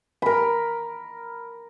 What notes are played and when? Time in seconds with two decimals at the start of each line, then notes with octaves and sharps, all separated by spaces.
0.22 A#4 B5